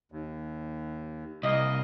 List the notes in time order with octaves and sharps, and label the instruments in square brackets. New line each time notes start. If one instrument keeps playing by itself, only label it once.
[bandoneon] D#2
[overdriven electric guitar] C2 [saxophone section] A#3 D#5